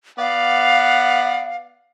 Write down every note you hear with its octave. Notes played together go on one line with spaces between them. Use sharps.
B3 D5 F5 F#5